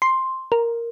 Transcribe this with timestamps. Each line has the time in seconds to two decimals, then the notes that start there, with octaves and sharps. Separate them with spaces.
0.02 C6
0.52 A#4